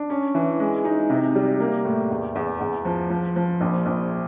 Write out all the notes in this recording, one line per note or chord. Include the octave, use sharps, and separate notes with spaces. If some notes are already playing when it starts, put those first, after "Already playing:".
Already playing: D4
C#4
E3
G#3
D#4
C3
G3
A#3
A2
E2
E2
E2
F3
F3
F3
A#1
A#1